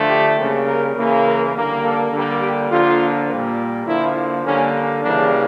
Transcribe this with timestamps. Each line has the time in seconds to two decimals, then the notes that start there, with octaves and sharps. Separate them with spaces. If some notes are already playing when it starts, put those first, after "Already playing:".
Already playing: D3 F3 A3
0.10 G4
0.38 C#3 G3 A#3
0.67 A#4
0.96 C#3 E3 A#3
1.25 A#4
1.55 D3 G3 A#3
1.84 A4
2.13 D3 G3 A#3
2.42 G4
2.70 D3 F3 A#3 F4
3.29 A#2 G3 A#3
3.87 D3 F3 A#3 E4
4.45 D3 G3 A#3 C#4
5.03 C#3 E3 G3 A#3 D4